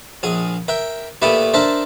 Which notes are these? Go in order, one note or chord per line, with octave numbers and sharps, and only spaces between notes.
A#1 G#4
A#4 E5 G5
A#2 E3 A3 B3 E4 G4
D4 A#4 C5 E5 A5